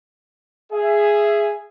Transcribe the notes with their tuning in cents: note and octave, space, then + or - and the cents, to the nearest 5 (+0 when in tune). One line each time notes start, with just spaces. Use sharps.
G#4 +0 E5 +20